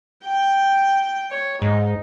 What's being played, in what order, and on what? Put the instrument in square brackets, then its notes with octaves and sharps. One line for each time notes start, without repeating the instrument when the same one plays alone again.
[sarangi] G5
C#5
[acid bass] G#2 [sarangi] D#4